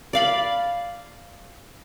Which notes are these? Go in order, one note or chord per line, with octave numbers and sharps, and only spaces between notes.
D5 F5 B5